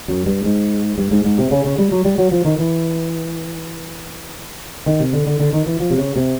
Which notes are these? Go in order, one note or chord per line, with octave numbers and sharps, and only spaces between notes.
F#2
G2
G#2
G2
G#2
G#2
C3
C#3
C#3
G3
F#3
G3
F#3
F3
D#3
E3
D#3
C3
D3
D3
D3
D#3
E3
F3
C3
C#3
C3